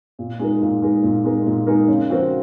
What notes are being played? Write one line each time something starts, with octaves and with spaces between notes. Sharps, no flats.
A#2
G#3 D#4 A#4
A#2
G#3 D#4 A#4
A#2
G#3 D#4 A#4
A#2
G#3 D#4 A#4
C#3
F3 C4 F#4 A#4